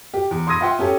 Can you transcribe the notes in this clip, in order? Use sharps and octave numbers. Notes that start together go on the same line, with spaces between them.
G4
E2
B5 C6 D#6 G#6 A#6 D#7
F4 E5 F#5 G5 C6
C#4 G4 A4